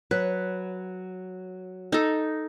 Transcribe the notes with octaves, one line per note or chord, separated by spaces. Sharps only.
F#3 B4
D#4 A4